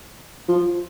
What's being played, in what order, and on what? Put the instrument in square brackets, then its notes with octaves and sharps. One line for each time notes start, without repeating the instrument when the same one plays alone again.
[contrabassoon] F3